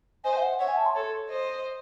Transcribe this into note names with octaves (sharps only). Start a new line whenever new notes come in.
C5 D#5 G#5
E5
F#5
C#5 E5 F#5
G#5
A5
C6
A4 C#5
C5 D#5